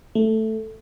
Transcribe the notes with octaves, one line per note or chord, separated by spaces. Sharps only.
A3